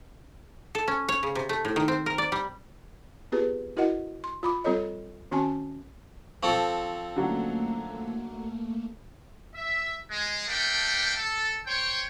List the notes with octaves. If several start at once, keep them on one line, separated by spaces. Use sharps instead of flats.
A4
C#4
C#5
C#3
C3
A3
A2
D#3
C4
A#4
D5
G3
B3 C4 F4 G4 G#4 B4
E4 F#4 A#4 D#5 F#5
C6
F4 B5 D6
G3 C4 F4 A4 C#5 D#5
D#3 C4 C#4 F#4 G#5 A5
F3 C4 A4 C#6
D3 F#3 A3 A#3 C#4
E5
G#3
A3 A#3 D4 G5
A4
C5 C#5 G5